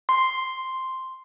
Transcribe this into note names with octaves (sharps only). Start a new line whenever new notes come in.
C6